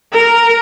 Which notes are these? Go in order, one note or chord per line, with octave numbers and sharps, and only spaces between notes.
A#4